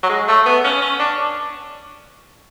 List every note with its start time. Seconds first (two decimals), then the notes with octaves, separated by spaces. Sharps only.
0.03 F#3
0.09 G#3
0.28 A3
0.46 B3
0.64 C#4
0.82 C#4
0.99 D4